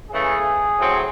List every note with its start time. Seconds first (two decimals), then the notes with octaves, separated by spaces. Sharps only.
0.10 C#3 E3 A3 G#4
0.79 A2 F#3 C4